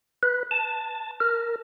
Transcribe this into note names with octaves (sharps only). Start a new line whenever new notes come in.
B4
A5
A#4